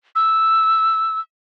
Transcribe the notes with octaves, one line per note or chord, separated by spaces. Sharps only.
E6